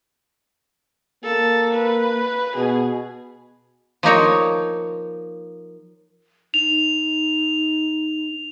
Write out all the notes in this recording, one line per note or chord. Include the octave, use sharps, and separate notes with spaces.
A#3 A4
B4
B2 G#4
F3 A#3 D#4 C#5
D#4 F7